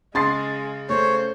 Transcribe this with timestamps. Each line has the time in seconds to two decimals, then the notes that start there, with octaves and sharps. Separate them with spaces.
0.15 C#3 G#3 C6 D#6 A6 C7
0.89 A3 C5 C#5